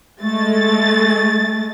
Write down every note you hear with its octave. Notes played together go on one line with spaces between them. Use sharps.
G#3 A3 A6